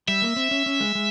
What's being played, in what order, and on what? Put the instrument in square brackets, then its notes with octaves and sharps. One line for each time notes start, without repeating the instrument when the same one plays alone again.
[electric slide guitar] G3 [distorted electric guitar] E5
[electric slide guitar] A#3
C4
C#4
C#4
G#3
G#3